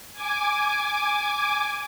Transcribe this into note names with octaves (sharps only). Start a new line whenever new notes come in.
G#5 D6